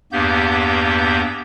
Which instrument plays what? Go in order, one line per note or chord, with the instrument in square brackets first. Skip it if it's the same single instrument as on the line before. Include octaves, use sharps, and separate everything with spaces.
[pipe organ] E2 G2 A#3 B3 G4 G6